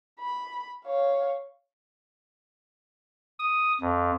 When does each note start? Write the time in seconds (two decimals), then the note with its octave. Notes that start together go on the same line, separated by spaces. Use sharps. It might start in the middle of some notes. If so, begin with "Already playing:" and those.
0.20 B5
0.85 C#5 F5
3.39 D#6
3.81 F2